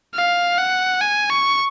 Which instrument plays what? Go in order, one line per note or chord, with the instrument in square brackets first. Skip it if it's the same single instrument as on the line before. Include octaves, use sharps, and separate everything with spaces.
[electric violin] F5
F#5
G#5
C#6